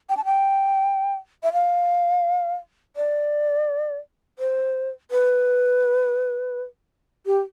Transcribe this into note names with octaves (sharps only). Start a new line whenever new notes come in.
G5
A5
G5
E5
F5
D5
C5
B4
G4